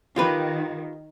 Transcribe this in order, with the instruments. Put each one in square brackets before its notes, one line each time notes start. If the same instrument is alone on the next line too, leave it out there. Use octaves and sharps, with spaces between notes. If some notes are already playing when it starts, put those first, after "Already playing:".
[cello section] D#3 [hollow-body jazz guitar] F4 G4 B4